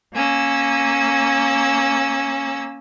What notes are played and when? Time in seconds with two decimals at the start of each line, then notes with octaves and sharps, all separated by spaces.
0.14 A#3 C#4 E6